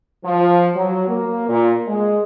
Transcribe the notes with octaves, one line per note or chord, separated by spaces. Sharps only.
F3
F#3
A#3
A#2
G#3